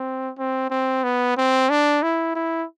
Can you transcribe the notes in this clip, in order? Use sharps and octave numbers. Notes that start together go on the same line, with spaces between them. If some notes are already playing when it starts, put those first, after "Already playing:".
Already playing: C4
C4
C4
B3
C4
D4
E4
E4